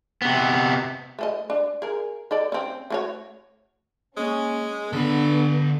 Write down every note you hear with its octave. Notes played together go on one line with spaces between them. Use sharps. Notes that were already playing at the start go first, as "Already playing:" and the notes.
C3 B3
A3 A4 D#5
D4
G#4 A#4
D#4 A4 D5
C4 C#4
A3 F#4 C#5
G#3 A#3 C#4
D3 B3 D4 A4 B5